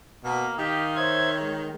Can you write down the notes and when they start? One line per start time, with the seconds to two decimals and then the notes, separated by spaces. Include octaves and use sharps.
0.24 B2 A#3
0.58 D#3 G4 D#5 F5
0.97 C5 C#5 E5 G#6
1.40 G#3